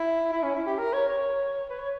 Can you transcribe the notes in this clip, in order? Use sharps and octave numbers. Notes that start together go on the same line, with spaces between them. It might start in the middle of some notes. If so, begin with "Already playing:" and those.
Already playing: E4
E4
C#4
E4
G4
A#4
C#5
C#5
B4
C#5